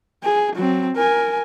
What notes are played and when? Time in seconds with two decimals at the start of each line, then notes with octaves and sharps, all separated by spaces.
0.24 G#4
0.55 F#3 C4
0.96 A#4 G#5